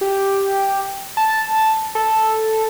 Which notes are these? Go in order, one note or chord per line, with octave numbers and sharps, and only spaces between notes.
G4
A5
A4